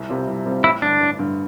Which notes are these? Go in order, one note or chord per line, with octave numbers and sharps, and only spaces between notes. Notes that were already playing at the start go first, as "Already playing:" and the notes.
Already playing: C2
C3 G3 C4 F4
C2
C3 G3 C4 F4
A1 E4
G2 D3 D4
A1
G2 D3